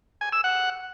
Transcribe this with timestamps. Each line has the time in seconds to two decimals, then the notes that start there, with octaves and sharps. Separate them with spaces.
0.21 G#5
0.33 E6
0.44 F#5